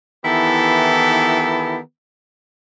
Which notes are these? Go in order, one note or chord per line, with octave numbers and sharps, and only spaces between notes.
D#3 E3 B3 E4 G4 A4